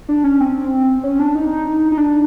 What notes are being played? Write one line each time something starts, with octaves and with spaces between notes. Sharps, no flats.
D4
C#4
C4
C#4
D4
D#4
D#4
D4